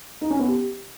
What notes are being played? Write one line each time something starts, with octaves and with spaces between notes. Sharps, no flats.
D#4
C#4
B3
G4